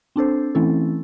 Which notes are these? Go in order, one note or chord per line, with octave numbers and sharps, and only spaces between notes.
C4 D4 A4 C5
E3 A3 C4 C#4 E4 A4